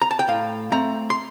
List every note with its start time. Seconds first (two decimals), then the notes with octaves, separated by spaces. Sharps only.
0.02 A#5
0.11 A5
0.19 G5
0.28 A2 F5
0.72 A3 C4 A#5
1.10 C6